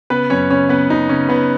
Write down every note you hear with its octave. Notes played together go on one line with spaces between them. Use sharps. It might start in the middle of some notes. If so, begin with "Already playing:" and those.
C#3 B3 B4
F#2 C#4 C#5
C#3 C#4 C#5
C#3 B3 B4
C#3 D#4
C#3 C#4
C#3 B3 B4